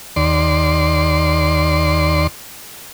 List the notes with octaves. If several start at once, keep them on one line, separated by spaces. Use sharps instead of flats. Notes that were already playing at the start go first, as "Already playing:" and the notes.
D#2 D5 C6